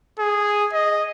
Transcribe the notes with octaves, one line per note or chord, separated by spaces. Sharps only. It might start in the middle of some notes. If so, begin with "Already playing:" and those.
G#4
D#5